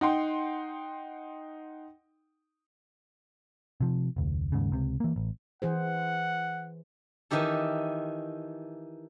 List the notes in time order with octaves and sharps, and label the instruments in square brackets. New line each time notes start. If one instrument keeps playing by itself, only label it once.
[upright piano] D#4 F#5 G5 C6
[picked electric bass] C3 F3
F1 D2
D#2 G#2 C#3
C#2 C3
E3 A#3
A1
[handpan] E3 G#4 C5 [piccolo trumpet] F#5
[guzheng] D#3 E3 D#4 G4 A4